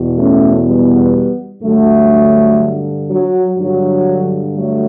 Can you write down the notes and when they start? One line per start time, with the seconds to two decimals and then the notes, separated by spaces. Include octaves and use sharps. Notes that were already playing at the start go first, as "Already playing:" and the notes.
Already playing: E2 B2
0.17 A3 C#4
0.66 G3 B3
1.63 G2 D3 F#3 A3
3.10 F#3
3.58 G2 D3 F#3
4.55 F#3 A3